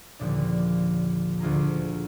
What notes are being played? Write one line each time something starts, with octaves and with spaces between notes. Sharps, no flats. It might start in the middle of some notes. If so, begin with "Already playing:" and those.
A#1 D#2 A#2 D3 F3 A#3
D2 F4 G#4 A#5